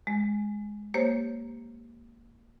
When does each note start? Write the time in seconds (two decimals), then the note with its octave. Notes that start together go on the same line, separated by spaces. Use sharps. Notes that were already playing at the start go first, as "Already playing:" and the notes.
0.07 G#3
0.94 A#3 G4 C5 C#5